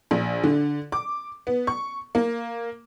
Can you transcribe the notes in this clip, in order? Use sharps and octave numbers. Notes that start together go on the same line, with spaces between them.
A#1
D3
D6
B3
C#6
A#3